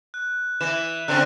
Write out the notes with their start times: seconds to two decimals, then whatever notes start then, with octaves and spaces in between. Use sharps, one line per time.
0.14 F#6
0.61 E3 E7
1.08 D3 C4 C#4 F#6